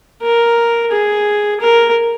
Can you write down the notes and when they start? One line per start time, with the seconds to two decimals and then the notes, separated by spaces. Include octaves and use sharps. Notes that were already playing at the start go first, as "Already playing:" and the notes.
0.22 A#4
0.91 G#4
1.61 A#4